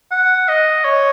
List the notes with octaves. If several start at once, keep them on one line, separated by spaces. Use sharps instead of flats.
F#5
D#5
C#5